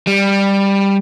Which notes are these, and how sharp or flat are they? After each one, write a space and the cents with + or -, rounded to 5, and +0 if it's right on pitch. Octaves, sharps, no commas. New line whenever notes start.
G3 +10